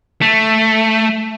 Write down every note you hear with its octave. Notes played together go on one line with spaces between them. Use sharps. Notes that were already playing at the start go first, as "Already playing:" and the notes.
A3